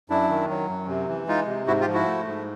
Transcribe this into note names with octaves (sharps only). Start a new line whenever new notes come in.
F#2 D4 E4
D#3
F#3
F#2
C3
E3
G#3 D#4 F4
C3
G#2 E4 F#4
F4 G4
F3
E4 F#4
A3
G#2